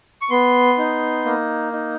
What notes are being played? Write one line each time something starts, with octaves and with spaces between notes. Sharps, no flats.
C#6
B3 C6
D#4
A#3
D#4